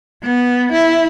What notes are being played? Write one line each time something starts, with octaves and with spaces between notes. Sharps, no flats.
B3
E4